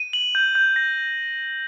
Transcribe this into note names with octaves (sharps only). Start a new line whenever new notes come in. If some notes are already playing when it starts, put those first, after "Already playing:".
Already playing: D#7
F#7
G6
G6
A#6